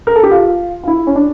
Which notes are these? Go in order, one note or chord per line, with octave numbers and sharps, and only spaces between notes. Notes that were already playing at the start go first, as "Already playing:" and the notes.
A#4
A4
G4
F4
F4
E4
C#4
D4